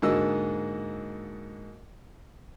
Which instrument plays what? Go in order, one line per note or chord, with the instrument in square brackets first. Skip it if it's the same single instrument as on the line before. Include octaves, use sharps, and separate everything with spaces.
[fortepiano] G#2 D3 A#3 F#4 D#5 E6